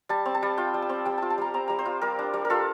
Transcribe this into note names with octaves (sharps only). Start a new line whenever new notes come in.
G3 A5
C4
A5
G3
F4 G5
G3
A5
C4
G3 G5
F4 A5
A5
G3 A#5
C4 A#5
G3 A#5
C5
F4
G3 A#4
D4
G3
A#4
F4 A4